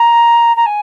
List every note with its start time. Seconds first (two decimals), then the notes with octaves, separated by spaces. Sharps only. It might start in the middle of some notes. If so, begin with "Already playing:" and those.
Already playing: A#5
0.56 A#5
0.66 G#5